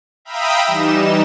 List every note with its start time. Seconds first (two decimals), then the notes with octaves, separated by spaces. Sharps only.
0.25 E5 F5 G5 A#5 B5 D#6
0.65 E3 G3 D#4 E7